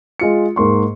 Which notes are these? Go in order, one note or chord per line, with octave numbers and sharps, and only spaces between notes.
G#3 F4 C#7
G#2 A#3 C6 C#6